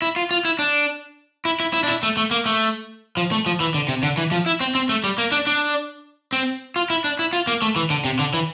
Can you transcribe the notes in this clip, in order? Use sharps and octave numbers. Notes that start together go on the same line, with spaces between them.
E4
F4
F4
E4
D4
E4
E4
E4
D4
E4
A3
A3
A#3
A3
F3
A3
F3
E3
D3
C3
D3
E3
F3
E4
C4
C4
A3
G3
A#3
D4
D4
C4
F4
E4
D4
E4
F4
A#3
A3
E3
D3
C3
D3
E3